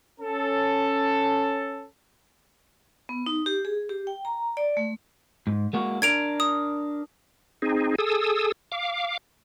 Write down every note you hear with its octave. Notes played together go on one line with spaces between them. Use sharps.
C#4 A4
B3
D#4
G4
G#4
G4
G5
A#5
D5
A3
G#2
G#3 A#3 F#4
D4 A#4 G#6 D7 F7
D#6
C4 D#4 G#4
G#4 A4 D#6 E6
F5 D6